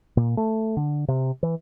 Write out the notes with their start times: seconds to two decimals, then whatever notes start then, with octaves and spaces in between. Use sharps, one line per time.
0.17 A#2
0.37 A3
0.77 D3
1.08 C3
1.43 E3